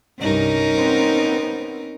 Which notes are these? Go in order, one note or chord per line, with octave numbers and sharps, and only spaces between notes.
C2 G2 C#4 D#4 A#4
B3 C4